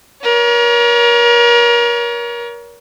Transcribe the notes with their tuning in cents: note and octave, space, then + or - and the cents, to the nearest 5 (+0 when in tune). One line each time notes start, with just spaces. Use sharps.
A#4 +35 C#5 +35